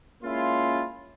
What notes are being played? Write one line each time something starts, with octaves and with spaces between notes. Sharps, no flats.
G#3 A#3 C#4 E4 F4